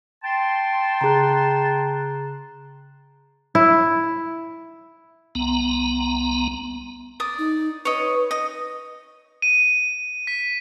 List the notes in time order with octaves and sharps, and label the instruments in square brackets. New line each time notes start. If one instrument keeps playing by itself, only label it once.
[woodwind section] G5 A5 C6
[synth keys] C#3 F#6 [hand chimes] G#4 A#5
[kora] E4
[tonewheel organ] C2 B3 A#5
[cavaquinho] D5 D#6
[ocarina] D#4
[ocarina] B4 [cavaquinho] C#5 D#5
[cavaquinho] D#5
[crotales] D#7
B6